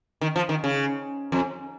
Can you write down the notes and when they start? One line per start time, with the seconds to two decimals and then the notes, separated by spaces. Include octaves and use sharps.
0.21 D#3
0.36 F3
0.49 D#3
0.64 C#3
1.32 F2